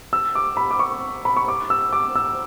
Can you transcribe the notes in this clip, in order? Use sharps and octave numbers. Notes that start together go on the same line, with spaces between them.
E6
D6
B5
D6
C#6
B5
C#6
D6
E6
D6
E6